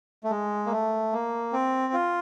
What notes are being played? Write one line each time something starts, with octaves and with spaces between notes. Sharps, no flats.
A3
G#3
A#3
A3
A#3
C4
F4